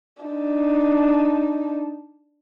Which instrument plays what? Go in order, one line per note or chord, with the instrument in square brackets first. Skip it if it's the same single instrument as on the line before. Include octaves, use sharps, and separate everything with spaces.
[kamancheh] D4 D#4